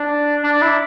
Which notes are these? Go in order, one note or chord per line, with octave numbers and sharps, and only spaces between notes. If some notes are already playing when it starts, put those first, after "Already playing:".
Already playing: D4
D4
E4